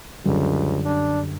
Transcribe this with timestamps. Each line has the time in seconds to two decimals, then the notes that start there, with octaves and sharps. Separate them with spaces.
0.25 C#2 F#2 D3 G3
0.85 D4